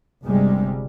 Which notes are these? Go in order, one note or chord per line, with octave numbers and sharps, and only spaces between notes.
G1 C3 G3 G#3